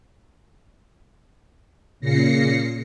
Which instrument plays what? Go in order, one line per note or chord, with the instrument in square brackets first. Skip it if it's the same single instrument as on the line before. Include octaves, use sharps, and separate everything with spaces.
[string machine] A#2 C#3 A#6 C7 C#7